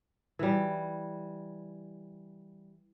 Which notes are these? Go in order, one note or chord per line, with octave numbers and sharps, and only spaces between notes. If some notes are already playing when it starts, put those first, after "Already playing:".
E3 G3